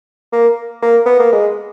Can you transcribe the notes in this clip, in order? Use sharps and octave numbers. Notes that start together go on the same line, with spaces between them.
A#3
A#3
B3
A#3
G#3